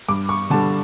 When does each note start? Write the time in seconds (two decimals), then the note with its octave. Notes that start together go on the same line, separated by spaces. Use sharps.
0.09 G2 D6
0.29 C#6
0.50 D3 G3 A5